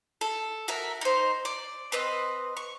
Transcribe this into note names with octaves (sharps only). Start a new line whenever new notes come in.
A4
F#4 A#4 E5
D#4 C5
D5
C4 B4 D#5
C#6